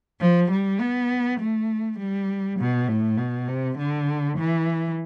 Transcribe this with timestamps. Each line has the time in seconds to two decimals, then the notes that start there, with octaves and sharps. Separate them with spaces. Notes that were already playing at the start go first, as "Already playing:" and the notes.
0.20 F3
0.51 G3
0.80 B3
1.40 A3
1.99 G3
2.59 B2
2.88 A2
3.18 B2
3.48 C3
3.78 D3
4.37 E3